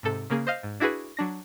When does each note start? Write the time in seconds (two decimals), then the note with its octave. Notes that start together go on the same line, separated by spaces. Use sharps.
0.03 G#2 C3 A4
0.30 C#3 A#3 G#4
0.47 C5 D#5 F5
0.63 G#2
0.80 D4 E4 F#4 G#4 B4
1.17 F#3 D4 A#6